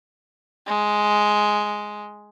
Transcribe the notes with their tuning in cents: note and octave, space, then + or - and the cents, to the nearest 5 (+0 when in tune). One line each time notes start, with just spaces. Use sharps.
G#3 +5